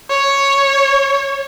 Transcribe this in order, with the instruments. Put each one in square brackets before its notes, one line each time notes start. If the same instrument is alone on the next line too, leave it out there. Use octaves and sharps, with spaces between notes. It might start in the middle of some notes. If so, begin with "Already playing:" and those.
[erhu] C#5